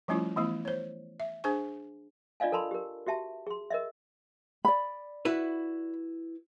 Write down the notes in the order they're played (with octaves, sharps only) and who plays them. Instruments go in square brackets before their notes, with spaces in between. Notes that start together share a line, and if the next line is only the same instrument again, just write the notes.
[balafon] F3 G3 A3 C#4 E4 F4
E3 A3 B3 E4
C5 C#5
E5
D4 G#4 C5 G#5 C#6
[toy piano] D4 F4 D5 D#5 F5 G#5
A4 A#4 A5 B5 C6
G4 A#4
F#4 G4 E5 A5
G#4 C6
A#4 D#5 E5
[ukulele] D5 B5
[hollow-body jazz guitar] E4 F#4 B4